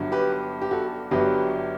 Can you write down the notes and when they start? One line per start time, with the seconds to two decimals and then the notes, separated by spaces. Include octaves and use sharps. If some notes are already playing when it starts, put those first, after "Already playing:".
Already playing: G1 G2 D3 F#3
0.12 G4 B4
0.62 G4
0.71 F#4 A4
1.11 G1 G2 F#3 G4 B4